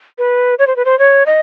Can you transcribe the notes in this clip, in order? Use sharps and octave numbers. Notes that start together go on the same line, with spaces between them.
B4
C#5
C5
B4
C5
C#5
D#5